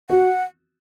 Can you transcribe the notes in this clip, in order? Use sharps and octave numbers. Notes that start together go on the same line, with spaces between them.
F#4 F#5